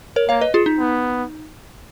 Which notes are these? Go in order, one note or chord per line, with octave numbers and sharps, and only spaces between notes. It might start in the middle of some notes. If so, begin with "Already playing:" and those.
A#4 C#5
A#3 C#5 F5
B4 D#5
F4 G#4
D#4
B3